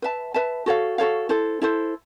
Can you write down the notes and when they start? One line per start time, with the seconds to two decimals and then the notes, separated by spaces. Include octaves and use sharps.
0.02 B4 E5 A5
0.34 B4 E5 A5
0.66 F#4 A4 C#5 F5
0.98 F#4 A4 C#5 F5
1.29 E4 A4 C5
1.62 E4 A4 C5